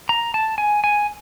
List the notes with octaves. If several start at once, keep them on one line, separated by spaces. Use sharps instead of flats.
A#5
A5
G#5
G#5